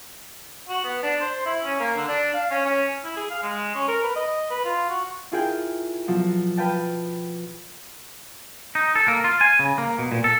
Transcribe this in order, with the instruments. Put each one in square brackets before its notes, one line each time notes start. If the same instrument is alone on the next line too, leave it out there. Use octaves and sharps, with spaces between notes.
[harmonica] F#4
B3
D4
C5
E4
C#4
A#3
D3
D4
F5
C#4
C#4
[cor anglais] E4
G#4
F5
G#3
C#4
A#4
B4
D#5
B4
F4
F#4
[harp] E4 F4 G#4 A#4 G5
B2 F3 F#3
B4 F5 G5 A5
[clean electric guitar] D#4
A4
A#3
F4
G#5
C#3
A#3
B2
A#2
A4